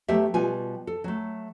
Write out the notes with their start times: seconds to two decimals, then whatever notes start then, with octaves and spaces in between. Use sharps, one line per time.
0.08 F#3 A3 B3 G4 E5
0.34 B2 G3 B3 F4 G#5
0.87 A4
1.04 F#3 A3